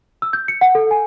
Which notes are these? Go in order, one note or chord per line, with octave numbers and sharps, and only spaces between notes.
E6
G6
C#7
F#5
A4
G#5